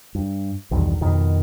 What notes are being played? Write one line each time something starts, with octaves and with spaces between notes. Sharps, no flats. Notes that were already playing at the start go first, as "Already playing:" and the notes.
G2
B1 E2 G2 D#3
F2 B2 D#3